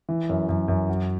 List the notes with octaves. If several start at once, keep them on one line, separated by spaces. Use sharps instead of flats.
E3
F#2
F#2
F#2
F#4